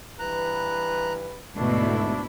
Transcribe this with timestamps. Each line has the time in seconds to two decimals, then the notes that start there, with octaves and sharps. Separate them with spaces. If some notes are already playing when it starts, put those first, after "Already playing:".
0.19 G2 E3 B4 A#5 F#6
1.56 D2 G#2 B2 D3 A3 D4 E4